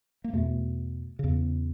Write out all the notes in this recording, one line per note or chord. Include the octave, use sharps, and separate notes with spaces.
A#3
E2 B2 A3
E2 C#3